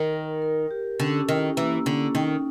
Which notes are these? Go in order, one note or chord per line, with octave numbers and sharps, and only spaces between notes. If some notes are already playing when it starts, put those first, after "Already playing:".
Already playing: D#3 A#4
A#4
A#4
G4
D3 C#4
D#3 E4
E3 A#3
D3 C#4
D#3 D#4